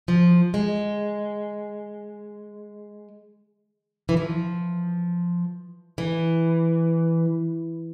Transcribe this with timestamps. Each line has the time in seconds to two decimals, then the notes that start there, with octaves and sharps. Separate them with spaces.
0.08 F3
0.54 G#3
4.09 E3
4.17 F3
5.98 E3